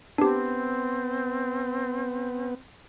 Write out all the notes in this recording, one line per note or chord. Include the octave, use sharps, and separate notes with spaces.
B3 C4 D4 G4